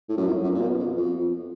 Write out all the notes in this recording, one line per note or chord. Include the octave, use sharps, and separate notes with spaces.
A2
F#2
F2
F#2
A#2
B2
F2
F2